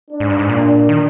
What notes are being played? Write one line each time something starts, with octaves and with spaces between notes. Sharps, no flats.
D4
G#2
G2
G#2
A#2 D4
D#3